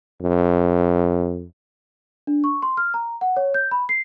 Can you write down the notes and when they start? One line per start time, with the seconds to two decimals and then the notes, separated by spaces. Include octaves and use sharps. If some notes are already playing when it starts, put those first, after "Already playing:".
0.22 F2
2.27 D4
2.44 C#6
2.62 C6
2.77 F6
2.94 A#5
3.21 F#5
3.37 C#5
3.54 G6
3.71 B5
3.89 C7